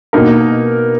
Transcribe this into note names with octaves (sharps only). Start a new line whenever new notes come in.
B2 A#3 D#4 A#4